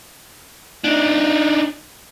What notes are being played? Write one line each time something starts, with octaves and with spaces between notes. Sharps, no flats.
D4 D#4